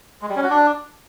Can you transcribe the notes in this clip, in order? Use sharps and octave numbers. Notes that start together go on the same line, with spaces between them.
G#3
G3
C#4
F#4
D4